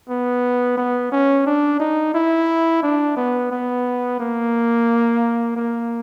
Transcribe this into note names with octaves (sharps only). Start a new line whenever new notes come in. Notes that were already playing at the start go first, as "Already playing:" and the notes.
B3
B3
C#4
D4
D#4
E4
D4
B3
B3
A#3
A#3